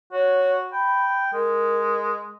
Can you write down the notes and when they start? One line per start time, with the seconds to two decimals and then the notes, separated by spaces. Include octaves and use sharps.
0.12 F#4 C#5
0.73 G5 B5
1.33 G#3 A#4